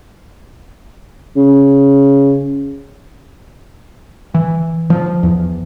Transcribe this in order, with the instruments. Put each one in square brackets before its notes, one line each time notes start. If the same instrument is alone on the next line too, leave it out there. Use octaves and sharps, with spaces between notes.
[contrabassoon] C#3
[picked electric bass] E3
F3
E2